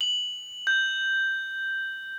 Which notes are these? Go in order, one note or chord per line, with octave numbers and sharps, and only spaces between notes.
F#7
G6